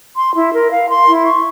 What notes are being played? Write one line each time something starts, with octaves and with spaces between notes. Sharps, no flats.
C6
E4
A#4
F5
C6
E4
C#6